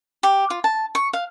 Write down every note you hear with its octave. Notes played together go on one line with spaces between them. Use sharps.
G4
F4
A5
C#6
F5